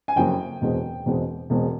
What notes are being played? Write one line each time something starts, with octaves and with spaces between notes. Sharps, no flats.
G#5
F#1 F2 C#3 F#3 A#3 G5
E1 E2 B2 G#3 C4
E1 E2 B2 G#3 C4
E1 E2 B2 G#3 C4